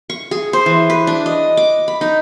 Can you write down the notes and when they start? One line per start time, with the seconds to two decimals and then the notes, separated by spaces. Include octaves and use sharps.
0.10 C#6
0.31 G#4
0.53 C5
0.66 E3
0.90 B4
1.07 D4
1.26 D#5
1.57 D6
1.88 B5
2.01 D#4